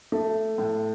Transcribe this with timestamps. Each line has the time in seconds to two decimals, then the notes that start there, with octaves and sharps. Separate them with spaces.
0.12 A3
0.58 A2